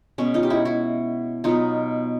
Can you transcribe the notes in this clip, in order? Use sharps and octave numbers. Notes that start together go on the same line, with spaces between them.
B2 G#3 B3 C#4
D#4 F4
G4
E4 F#4
E4 F#4
B2 F#3 B3 D#4 F4